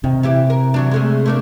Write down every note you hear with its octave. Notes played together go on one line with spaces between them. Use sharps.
C3 D#3
E3 E4 G4
A#4
E3 F#3 D4
G#3 A3 G#4
A3 A#3 D4